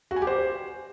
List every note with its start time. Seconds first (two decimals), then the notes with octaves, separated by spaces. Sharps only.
0.11 F#4
0.16 G#5
0.22 G4
0.27 C5